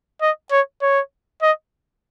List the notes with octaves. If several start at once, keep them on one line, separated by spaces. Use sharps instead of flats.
D#5
C#5
C#5
D#5